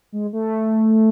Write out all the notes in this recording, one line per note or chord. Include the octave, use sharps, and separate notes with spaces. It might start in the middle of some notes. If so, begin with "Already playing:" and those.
G#3
A3